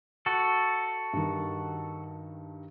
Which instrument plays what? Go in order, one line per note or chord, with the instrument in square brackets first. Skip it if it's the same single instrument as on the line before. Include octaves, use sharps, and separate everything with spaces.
[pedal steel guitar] F#4 A4
[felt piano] G2 D#3